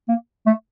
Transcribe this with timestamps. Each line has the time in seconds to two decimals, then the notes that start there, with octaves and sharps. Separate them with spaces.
0.08 A#3
0.46 A3